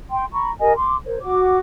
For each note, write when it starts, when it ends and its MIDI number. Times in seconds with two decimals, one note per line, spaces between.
0.10 0.25 79
0.10 0.25 84
0.32 0.51 82
0.32 0.51 83
0.32 0.51 85
0.60 0.73 67
0.60 0.73 70
0.60 0.73 75
0.60 0.73 80
0.76 0.96 84
0.76 0.96 86
1.05 1.18 70
1.05 1.18 72
1.05 1.18 73
1.21 1.59 66
1.21 1.59 86